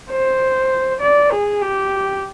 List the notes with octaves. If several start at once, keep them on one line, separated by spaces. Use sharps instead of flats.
C5
D5
G#4
G4